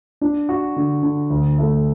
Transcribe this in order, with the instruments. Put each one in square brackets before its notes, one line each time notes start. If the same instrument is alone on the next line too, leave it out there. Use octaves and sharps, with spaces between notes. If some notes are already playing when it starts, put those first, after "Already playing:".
[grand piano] D4
F#4
D3
D3
D2
A3